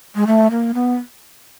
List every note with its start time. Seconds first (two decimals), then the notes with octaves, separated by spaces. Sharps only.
0.15 G#3
0.27 A3
0.51 A#3
0.74 B3